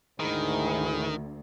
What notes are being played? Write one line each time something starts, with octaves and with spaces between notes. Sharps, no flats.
D2 G#2 D#3 E4 G#4